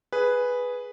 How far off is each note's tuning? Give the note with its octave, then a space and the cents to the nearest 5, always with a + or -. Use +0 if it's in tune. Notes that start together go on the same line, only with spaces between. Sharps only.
G#4 +0 B4 +0